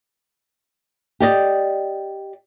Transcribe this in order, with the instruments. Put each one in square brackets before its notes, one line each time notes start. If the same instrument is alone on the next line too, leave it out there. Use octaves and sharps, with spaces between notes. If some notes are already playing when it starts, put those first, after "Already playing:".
[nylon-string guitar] G4 D5 D#5